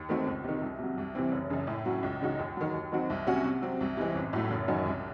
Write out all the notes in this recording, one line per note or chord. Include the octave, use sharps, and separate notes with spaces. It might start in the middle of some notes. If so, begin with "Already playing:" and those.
Already playing: D#2
D#3 A3 C4 F#4
C#2
C3 D#3
C2
C3 F#3
C2
C3 E3 C4
F#1
F#2 C#3
A2
F#3 C#4 F#4
C#2
C#3 G#3 D#4 F#4
D#2
D#3 F#3
D#2
D#3 F#3 C4 F#4
C2
C3 F#3 C#4 F#4
C3
F#3 C4
C2
C3 E3 G#3 C4
A1
A2 F#3 A3
F#1
F#2 D#3 F#3 C#4
C2